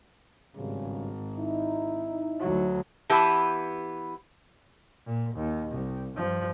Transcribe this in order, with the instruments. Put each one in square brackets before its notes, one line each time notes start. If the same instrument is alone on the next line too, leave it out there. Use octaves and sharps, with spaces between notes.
[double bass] G#1 [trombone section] G2 C#3
[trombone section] D#4 E4
[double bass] D2 F#3
[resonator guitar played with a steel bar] E3 B3 G4 B4 A5
[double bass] A#2
D#2
C2
G2 F3